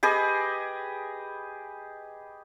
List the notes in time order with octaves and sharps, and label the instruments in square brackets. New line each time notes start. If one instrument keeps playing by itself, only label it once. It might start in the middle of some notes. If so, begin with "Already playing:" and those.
[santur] G4 G#4 B4 D#5